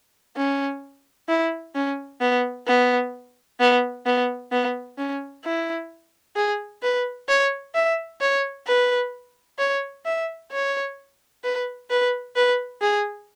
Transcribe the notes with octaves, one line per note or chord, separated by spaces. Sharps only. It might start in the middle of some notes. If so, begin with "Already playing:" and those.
C#4
E4
C#4
B3
B3
B3
B3
B3
C#4
E4
G#4
B4
C#5
E5
C#5
B4
C#5
E5
C#5
B4
B4
B4
G#4